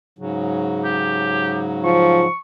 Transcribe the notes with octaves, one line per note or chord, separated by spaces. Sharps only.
G#2 C#3 F#3
G4
F3 C#6